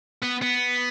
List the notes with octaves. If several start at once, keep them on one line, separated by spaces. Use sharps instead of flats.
B3
B3